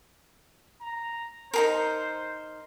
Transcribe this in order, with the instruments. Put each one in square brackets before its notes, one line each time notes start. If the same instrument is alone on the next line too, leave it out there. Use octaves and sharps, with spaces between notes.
[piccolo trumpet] A#5
[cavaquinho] D#4 G#4 A#4 [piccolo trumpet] C5